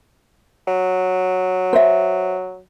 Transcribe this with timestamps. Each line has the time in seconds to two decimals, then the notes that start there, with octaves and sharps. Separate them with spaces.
0.68 F#3
1.73 C5 E5